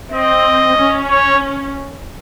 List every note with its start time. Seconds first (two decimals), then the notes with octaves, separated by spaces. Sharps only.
0.11 C4 D#5
0.77 C#4
1.09 C#5